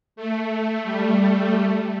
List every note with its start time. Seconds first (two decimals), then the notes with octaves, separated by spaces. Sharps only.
0.16 A3
0.84 G3
1.50 A3